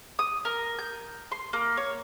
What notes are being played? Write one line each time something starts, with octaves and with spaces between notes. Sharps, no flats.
D#6
A#4
G6
C6
A#3
C#5